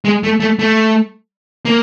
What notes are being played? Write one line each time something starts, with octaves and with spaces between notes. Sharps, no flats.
G#3
A3
A3
A3
A#3